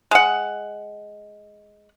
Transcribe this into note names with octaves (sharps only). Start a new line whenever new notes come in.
G#3 F#5